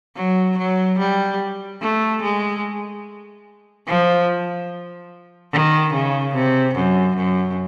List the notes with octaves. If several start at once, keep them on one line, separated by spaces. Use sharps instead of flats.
F#3
F#3
G3
A3
G#3
F3
D#3
C#3
C3
F#2
F#2